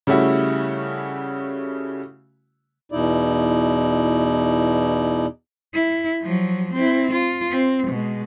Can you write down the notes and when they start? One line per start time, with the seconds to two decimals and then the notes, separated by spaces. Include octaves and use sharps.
0.07 C#3 G3 A3 C#4 E4 F#4
2.92 E2 B2 D#4 E4 D5
5.74 E4
6.22 F3 F#3
6.75 C4 E4
7.11 F4
7.51 C4
7.88 B2 G#3